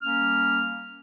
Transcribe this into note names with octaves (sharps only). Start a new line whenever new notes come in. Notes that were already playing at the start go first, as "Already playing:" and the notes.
G3 A#3 C#4 F6